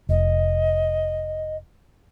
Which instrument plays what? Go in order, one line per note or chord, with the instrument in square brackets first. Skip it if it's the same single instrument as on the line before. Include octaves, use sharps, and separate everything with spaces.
[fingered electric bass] F1 [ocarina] D#5